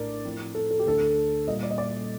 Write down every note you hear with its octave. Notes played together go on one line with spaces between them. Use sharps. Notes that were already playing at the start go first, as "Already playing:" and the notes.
Already playing: A#1 A2 A3 D4 A#4 D5
A2 F3 C4
A4
A4
G4
D2 D3 A3 D4 A4
A#2 G3 A#3 D#5
D5
D#5
D5